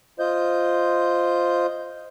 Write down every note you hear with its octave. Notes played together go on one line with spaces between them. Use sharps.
F4 C5 D#5 G6